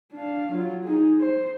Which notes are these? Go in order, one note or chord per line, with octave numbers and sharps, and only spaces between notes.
D4 F5
F#3 F4
D#4 G#4
C5